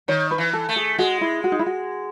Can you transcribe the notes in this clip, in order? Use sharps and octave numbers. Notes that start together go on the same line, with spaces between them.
D#3 C#5
B4
E3
A4
A3
G#4
G#3 F#4
E4
F#4
D#4
E4
F#4